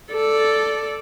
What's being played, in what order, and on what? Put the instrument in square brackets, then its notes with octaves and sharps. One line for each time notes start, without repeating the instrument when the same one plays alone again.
[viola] A4 D5